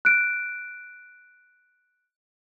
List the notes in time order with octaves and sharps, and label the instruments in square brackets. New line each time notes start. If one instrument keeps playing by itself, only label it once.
[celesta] F#6 D7